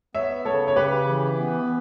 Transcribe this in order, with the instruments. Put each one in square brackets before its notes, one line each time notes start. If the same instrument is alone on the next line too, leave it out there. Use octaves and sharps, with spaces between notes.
[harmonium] B3 [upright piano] C#5 E5
[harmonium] C#3 [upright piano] A4 C#5
[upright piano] C#5
[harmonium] C#3 [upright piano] G4 B4
[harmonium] E3
B3